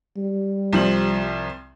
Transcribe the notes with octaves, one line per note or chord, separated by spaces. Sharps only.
G3
C2 F3 F#7